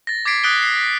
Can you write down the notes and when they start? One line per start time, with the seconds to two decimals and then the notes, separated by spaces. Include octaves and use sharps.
0.07 A6 A#6
0.25 D6 G#6 A6 B6 C7 D7
0.43 D#6 F#6 A6 B6 D7 G7
0.62 B6 C7
0.77 F#6 B6